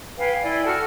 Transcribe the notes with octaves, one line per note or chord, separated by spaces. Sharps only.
B4 F5 G5 G#5
E4 D5 G5 G#5
F#4 A4 A5 F6